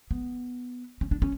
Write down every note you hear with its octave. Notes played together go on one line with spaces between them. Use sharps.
B3
C#4
D4
C#4